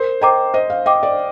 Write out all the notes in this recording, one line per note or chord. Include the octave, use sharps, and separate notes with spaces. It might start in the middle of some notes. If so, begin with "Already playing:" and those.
Already playing: A#4 C5
C5 D#5 G5 A#5 D6
C5 D#5
F5
D#5 G5 D6
D5